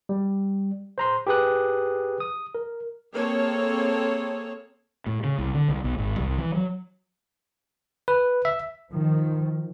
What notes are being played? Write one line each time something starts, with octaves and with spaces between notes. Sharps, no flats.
G3
C5 A#5 C6
G4 G#4 B4 D#6 F#6
D#6
A#4
A#3 C4 G#4 A4 C#5
A2
C#3
C2
D3
C2
B1
G#1
C2
E3
F#3
B4
E5
D#3 F3